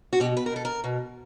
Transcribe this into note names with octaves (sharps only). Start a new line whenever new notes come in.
F#4
B2 G4
B4
A#4
B2 A4
A#4
B2